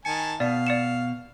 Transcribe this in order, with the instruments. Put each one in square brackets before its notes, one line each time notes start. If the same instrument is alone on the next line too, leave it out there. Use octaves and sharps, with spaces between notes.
[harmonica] D#3 G#5 A5 [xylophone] C#7
[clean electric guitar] B2 [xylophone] D5 [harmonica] F5
[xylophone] D5 C#7 E7